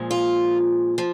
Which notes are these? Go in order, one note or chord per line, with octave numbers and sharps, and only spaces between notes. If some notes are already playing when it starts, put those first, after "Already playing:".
Already playing: A#2 F3 G#3
F4
F3